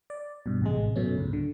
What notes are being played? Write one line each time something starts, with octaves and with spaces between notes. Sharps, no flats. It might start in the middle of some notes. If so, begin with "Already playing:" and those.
D5
G2 B2
A1 C3 G#3
F#2 B2 A3 C#4
C#2 G#2
D3